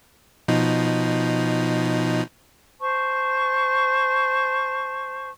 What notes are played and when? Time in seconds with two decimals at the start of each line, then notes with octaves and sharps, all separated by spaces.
0.48 B2 F3 D#4
2.81 C5 A5 C#6